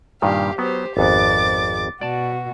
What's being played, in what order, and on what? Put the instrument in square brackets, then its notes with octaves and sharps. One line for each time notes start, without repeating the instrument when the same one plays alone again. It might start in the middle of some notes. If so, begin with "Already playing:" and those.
[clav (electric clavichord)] G2 A#2 D#3 [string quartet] G4 F5
[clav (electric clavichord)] F#3 B3 [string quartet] G4 C5
[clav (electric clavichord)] G#1 F2 B3 [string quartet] D6 A6
[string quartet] B2 F#4 [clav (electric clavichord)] D5 A5